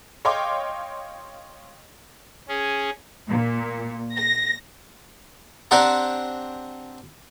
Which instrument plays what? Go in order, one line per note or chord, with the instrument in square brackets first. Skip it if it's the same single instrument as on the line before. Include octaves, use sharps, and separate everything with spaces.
[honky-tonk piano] C#5 D#5 F5 G5 C6 D6
[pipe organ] C#4 G#4
[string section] A#2
A#6
[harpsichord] C4 D4 G4 C5 F#5 A#5